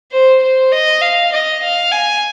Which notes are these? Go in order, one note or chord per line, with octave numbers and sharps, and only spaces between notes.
C5
C5
D#5
F5
D#5
F5
G#5